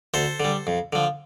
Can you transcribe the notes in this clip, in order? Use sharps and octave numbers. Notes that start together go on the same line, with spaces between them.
D2 A4 C5
D3 G3
F2
D3 F3